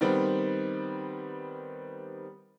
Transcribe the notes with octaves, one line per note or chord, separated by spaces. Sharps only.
D#3 G3 B3 C4